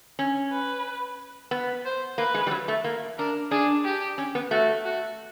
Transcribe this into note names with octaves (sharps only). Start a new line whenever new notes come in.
C#4
B4
B3
C5
A#3 B4
G#3
G3
F#3
A3
A#3
D4 A#4
D4 G#4
G4
C#4
B3
A3 F#4
F#4